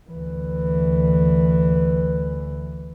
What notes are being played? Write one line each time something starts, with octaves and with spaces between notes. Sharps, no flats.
D2 E3